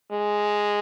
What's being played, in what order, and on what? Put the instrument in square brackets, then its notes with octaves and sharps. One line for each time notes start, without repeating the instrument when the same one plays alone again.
[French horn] G#3